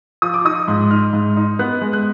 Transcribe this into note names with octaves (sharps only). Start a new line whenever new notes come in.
F3 D#6
D6
D#4 D#6
G#2
D#4 F6
G#2
D#4
B3 F#6
G#3
F#6